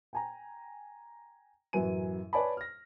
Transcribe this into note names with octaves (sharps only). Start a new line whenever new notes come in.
G5 G#5 A#5
A1 F#2 F#3 B4 G#5 D#7
B4 C#5 D5 G#5 A5 B5
F6 A#6